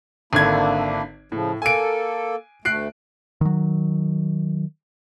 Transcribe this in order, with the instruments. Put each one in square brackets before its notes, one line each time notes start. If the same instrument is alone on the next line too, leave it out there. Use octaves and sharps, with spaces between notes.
[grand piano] G#1 D3 G#6 [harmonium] A#3 D4 E4
[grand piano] A2 [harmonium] C#3 F3
[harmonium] A#3 A4 [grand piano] G#5 D7
[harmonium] D2 A3 [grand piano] F#6 C7 D7
[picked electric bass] D#3 F#3